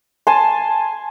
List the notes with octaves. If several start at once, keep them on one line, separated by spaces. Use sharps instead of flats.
G#5 A5 C6